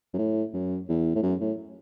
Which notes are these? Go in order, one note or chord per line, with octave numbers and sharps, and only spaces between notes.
F#2
A2
F#2
E2
A2
F#2
A2